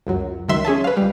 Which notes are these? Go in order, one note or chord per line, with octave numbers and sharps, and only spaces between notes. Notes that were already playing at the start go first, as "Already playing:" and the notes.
C#2 F#2 F#3
C#2 D#3 F#3 E5 C6
C#4 G#4 E5 A5
B4 F5
C#2 G3